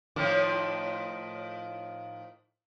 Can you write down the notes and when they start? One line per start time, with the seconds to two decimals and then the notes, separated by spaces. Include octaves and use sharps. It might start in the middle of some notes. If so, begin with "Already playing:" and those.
0.16 A2 D#3 F3